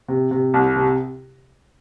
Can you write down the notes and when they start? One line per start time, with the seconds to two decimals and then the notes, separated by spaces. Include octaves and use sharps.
0.08 C3
0.31 C3
0.54 C2
0.76 C3